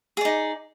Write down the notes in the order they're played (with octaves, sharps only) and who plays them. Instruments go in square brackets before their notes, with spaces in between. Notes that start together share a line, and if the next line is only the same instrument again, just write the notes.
[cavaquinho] G#4
D5
D#4